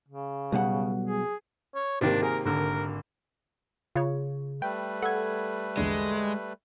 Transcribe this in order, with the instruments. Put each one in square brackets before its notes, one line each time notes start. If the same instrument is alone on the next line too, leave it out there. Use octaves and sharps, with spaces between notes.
[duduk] C#3
[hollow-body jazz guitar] B1 B2 F#5 [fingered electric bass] G3
[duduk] G#4
[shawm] C#5
[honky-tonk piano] G#1 [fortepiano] C3 D#3 A#3 [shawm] D4
[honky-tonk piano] G#4 [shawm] A#4
[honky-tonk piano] G#1 D3 [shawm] A#4
[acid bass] C#3 [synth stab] F4 C#5
[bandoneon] G3 A3 B4 [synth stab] G5
[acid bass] A4 [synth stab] F#5 G#6
[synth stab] A#1 E2 D3 [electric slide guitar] G#3